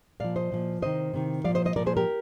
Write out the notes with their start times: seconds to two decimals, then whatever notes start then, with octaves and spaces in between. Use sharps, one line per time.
0.20 A#2 F3 D5 F5
0.36 C5 D#5
0.52 A#2 F3
0.82 C3 D#3 C5 D#5
1.13 C3 D#3
1.44 A#2 F3 D5 F5
1.55 C5 D#5
1.65 C5 D#5
1.76 A#2 F3 A#4 D5
1.86 G#4 C5
1.97 G4 A#4